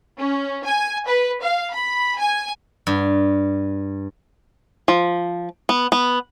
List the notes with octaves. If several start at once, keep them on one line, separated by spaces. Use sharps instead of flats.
C#4
G#5
B4
F5
B5
G#5
G2
F3
B3
B3